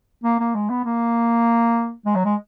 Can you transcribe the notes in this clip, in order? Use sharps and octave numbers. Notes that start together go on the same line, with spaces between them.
A#3
A#3
G#3
B3
A#3
G#3
F#3
G#3